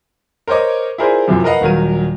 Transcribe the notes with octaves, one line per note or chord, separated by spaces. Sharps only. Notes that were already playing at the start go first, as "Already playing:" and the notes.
A#4 C5 C#5 D#5 D6
E4 F4 G#4 A#4 C5 D5
F#2 C3 E3 F3
A#4 B4 D#5 F5 F#5
D#1 D#3 F#3 A#4 D#7